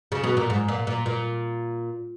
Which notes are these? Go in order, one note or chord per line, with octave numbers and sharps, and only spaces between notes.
C#3
B2
A#2
G#2
A#2
A#2
A#2